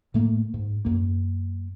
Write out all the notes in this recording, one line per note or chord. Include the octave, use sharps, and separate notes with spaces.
A2 A3 A#3
G#2
F#2 A#3